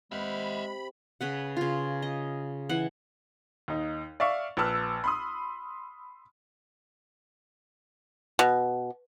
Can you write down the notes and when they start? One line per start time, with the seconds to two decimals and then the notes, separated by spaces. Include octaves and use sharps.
0.12 C3 G#3 E5 F#5 B5
1.21 C#3 B4 F#5
1.57 C#3 F4
2.02 D#5
2.69 E3 F#5
3.68 D#2 D#4
4.20 D5 E5 F5 C#6
4.57 A#1 B4 A5 E6 F6
5.04 B5 C6 D#6
8.39 B2